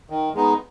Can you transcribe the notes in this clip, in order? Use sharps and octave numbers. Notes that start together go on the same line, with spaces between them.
D#3
G#3 B3 D#4